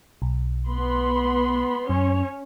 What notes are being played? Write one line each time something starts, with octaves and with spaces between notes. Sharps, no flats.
B1
B3 B5 C6
F#2 C#4 C#5